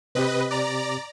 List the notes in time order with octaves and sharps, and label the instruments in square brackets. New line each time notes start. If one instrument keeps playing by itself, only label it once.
[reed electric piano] C3 C4 G4 [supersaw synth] B4 D#5
[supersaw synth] D5 A#5